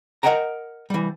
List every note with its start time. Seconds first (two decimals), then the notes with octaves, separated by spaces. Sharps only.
0.23 A#4 C5 D#5 F#5 G5 A#5
0.90 E3 G3